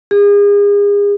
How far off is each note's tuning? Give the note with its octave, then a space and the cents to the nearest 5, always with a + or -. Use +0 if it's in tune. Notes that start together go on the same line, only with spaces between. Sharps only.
G#4 -35